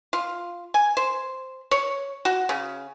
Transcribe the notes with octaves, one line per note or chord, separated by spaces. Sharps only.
F4
G#5
C5
C#5
F#4
C#3